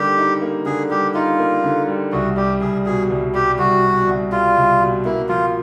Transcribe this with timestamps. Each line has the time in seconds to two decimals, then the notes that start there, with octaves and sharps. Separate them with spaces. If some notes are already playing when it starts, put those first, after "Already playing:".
Already playing: D3 G3 A#3 D#4 G4
0.18 D#4
0.42 A#3
0.66 D3 G#4
0.90 G3 G4
1.14 D#4 F4
1.39 A#3
1.64 D3
1.88 G3
2.12 C2 F#4
2.36 G3 G4
2.61 C2 G#4
2.86 B2 G#4
3.10 C2
3.34 G3 G4
3.58 C2 F#4
3.83 B2
4.07 C2
4.32 G3 F4
4.57 C2
4.80 B2
5.05 A#3 E4
5.29 F3 F4